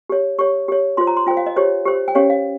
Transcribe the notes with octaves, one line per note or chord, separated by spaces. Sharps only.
G4 C#5
G4 C#5 C#6
G4 C#5
F4 C5 C6
A#5
C6
F4 C5 G5
F5
D#5
G4 C5 C#5
G4 C5
G5
C#4 G4 C#5 F5
F5